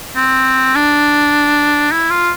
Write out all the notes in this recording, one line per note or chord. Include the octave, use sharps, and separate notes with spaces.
C4
D4
E4
F4